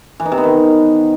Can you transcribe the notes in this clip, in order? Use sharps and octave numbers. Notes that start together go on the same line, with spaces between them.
E3
D#4
C3
B3
D#3